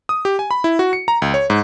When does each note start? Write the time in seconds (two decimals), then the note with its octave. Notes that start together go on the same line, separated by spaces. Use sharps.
0.09 D#6
0.25 G4
0.39 G#5
0.51 B5
0.64 E4
0.79 F#4
0.93 C#7
1.08 A#5
1.22 C#2
1.34 C#5
1.50 G#2